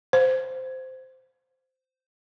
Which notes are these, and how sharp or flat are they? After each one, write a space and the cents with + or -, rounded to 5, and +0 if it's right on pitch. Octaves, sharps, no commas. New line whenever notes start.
C5 -10